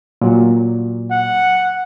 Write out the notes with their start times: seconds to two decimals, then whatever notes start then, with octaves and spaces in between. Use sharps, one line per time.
0.21 A#2 F#3
1.11 F#5